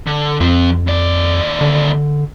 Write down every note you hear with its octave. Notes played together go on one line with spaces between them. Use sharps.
D3
F2 F3 C4
D#2 D5
D3